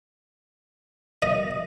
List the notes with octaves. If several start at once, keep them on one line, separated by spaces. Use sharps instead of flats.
D#5